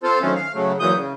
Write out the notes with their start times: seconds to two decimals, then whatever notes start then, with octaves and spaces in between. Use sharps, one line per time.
0.03 C4 F4 A4 C5
0.22 D#3 F#3 A3 C4 C#4
0.35 F5
0.54 C#3 F#3 A3
0.80 A#2 E3 F#3 D#6 G6
0.96 C#3